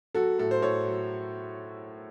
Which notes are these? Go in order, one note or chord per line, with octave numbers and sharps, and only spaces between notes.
F#3 F#4 A4
A2 A4
C5
A2 A4 C#5
F#3